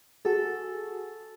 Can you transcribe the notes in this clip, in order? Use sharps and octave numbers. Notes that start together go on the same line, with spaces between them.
F#4 G#4 A4